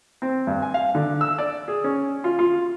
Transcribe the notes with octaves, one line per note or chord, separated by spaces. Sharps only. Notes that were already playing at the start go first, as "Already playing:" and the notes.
C4
G2
G#5
F5
D3
E6
D5
G#4
C#4
F4
F4